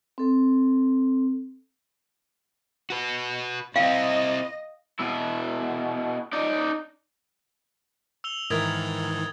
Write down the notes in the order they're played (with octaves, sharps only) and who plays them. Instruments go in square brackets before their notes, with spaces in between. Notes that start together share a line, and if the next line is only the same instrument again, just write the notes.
[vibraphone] C4 A4
[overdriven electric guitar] F#4 B4
[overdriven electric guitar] C4 E4 [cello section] D#5 [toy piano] F5 G5
[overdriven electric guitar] B2 E4
D#4 D5
[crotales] E6 F7 G7
[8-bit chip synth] G#2 D#3 E3 [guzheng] E4 A#4 [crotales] D#6 G#6 A6